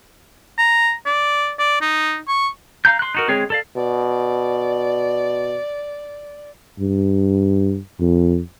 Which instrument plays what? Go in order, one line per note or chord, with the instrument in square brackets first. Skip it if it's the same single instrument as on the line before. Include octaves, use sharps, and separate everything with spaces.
[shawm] A#5
D5
D5
D#4
C#6
[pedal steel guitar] F5 A#5 G6
C6 F#6
D#4 F#4 A#4
G#3 C4 G#4 C#5
A4 D5 F5
[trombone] B2 [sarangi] D5
[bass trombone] G2
F2